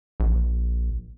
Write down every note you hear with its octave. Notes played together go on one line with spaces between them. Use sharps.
A#1